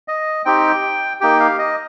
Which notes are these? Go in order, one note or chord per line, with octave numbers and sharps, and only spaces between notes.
D#5
C4 D#4 G4 G5
A#3 D#4 G4 G5
F5
D#5